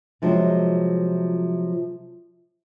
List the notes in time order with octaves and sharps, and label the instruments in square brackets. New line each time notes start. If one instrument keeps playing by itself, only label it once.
[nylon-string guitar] C3 F3 F#3 G#3